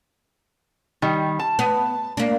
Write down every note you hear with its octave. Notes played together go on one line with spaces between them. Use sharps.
D#3 G3
A5
B3
A#3 D4